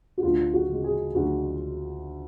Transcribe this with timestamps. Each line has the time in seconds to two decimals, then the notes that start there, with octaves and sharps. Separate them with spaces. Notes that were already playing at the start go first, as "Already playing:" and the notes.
0.18 F#4
0.23 D2 F4
0.53 F#4
0.69 C#3 G#3
0.84 G#4
1.15 D2 F#4